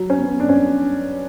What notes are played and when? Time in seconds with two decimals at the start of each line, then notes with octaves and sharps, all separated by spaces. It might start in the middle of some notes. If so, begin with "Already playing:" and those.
Already playing: F#3
0.10 C#4
0.18 B3
0.40 D4
0.49 C#4